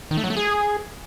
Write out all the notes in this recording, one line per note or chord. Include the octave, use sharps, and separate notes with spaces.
D#3
A3
F#3
A3
G#4